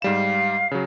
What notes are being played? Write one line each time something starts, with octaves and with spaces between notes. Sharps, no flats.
G#2 G3 F5 E7
C#3 F#3